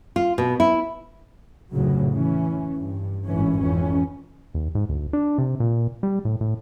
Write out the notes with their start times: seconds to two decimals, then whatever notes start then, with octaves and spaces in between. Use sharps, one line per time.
0.16 F4
0.38 B2
0.60 E4
1.72 F1 D2 A2 C#3 F#3
2.12 E3 C#4
2.75 G2
3.26 G#1 A2 E3 C#4
3.60 F2 E3 C#4
4.54 D#2
4.75 G#2
4.89 D2
5.13 D4
5.38 C3
5.60 A#2
6.03 G3
6.25 A2
6.41 A2